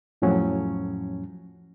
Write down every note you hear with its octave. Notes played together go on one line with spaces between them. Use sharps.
F2 A2 F3 F#3 C#4